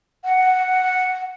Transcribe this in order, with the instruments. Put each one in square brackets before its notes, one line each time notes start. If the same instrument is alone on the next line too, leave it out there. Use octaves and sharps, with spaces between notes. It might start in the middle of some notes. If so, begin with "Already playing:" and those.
[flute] F#5